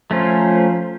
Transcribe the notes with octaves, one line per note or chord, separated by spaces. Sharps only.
F3 A3 C#4 F4 C5 A#5